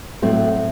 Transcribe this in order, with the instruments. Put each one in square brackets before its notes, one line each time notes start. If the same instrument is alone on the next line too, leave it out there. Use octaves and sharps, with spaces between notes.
[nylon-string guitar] A2 F#3 A3 C4